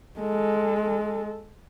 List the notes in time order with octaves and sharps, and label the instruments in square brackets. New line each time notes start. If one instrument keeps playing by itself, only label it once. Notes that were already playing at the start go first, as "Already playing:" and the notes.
[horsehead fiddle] G#3 A4